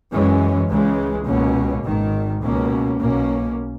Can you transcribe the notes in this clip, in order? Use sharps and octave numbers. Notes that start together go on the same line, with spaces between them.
F#2 E3 G#3 C#4
C#2 C#3 E3 G#3
C#2 B2 A#3 C#4
G#1 G#2 D#3
C#2 B2 A#3 C#4
B1 B2 A#3 C#4